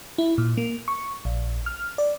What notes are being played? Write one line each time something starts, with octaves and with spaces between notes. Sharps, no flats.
E4
A#2
A#3
C#6
A#1
F6
D5